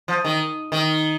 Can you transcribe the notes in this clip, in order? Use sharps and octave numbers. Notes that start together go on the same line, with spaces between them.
F3
D#3
D#3